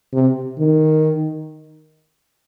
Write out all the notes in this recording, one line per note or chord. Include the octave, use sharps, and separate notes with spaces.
C3
D#3